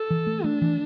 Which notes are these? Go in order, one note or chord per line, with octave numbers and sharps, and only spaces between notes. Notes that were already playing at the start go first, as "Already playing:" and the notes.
Already playing: A4
E3
A3
A3 D4
E3